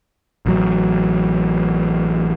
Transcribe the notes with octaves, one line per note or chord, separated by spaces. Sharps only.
A1 F#3